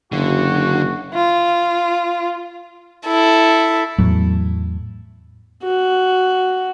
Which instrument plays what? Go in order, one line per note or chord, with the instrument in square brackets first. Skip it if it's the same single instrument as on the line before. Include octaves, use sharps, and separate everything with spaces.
[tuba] F#1 [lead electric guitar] D3 [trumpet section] F#4
[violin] F4
E4 A4
[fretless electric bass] E2 A2 F#3
[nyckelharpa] F#4